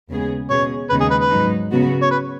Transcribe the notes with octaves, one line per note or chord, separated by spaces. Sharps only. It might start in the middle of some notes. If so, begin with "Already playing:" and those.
D#2 C#3 G#3 B3 G#4
B2 G#3 C#4 G#4 C#5
D#2 C#3 G#3 B3 D#4 B4
G#4
B4
B4
G#2 F#3 D#4
C#3 F#3 B3 F#4
C#5
B4